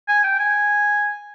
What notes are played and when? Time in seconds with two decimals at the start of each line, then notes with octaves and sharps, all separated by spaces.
0.09 G#5
0.24 G5
0.40 G#5